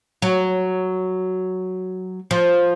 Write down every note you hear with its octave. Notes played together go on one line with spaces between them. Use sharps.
F#3
F3